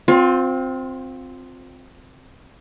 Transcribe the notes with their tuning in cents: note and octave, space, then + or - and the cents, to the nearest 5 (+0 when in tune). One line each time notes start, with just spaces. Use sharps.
C4 +0 F4 +30